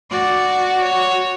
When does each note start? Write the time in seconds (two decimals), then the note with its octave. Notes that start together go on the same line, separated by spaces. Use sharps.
0.11 F#4 D5
0.83 C#5